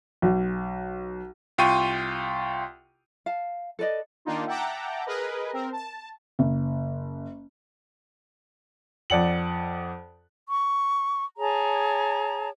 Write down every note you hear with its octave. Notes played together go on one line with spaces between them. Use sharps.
B1
C2 F4 G5 C6 C#6 D#7
F5 A5
A4 B4 D5 D#5
D#3 A#3 D4 D#4 F4
E5 F#5 G5 A5 A#5 D6
G#4 A#4 B4 D#5
C4 A#4
A5
F#1
F2 D5 F#5 F#7
C#6
G#4 C#5 A5 A#5